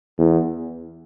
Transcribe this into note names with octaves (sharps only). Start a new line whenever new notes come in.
E2